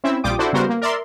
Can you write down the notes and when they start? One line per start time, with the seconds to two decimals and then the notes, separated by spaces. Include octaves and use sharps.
0.04 C4 C#4 E4 E5
0.24 A#1 G3 F4 G5 D6 D#6
0.39 D4 E4 F#4 A4 C5 D5
0.53 C#3 G3 B3 F#4 A#4 C5
0.69 A#3
0.82 A#4 D5 E5 C6